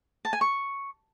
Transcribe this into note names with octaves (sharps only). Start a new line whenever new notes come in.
A5
G#5
C#6